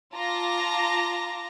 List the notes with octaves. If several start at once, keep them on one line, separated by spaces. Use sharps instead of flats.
F4 A5 A#5 D6 A#6